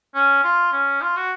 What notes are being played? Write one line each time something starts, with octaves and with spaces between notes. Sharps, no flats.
C#4
F4
C#4
F4
F#4